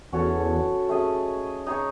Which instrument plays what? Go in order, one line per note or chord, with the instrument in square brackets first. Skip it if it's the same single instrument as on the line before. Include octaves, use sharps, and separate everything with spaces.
[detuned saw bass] E2 [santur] C#4 F#4 A4 C#5
[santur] A3 C#4 G#4 D#5
D#4 G#4 C#5